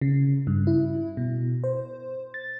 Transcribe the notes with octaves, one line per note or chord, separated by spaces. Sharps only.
C#3
G2
E4
B2
C5
A6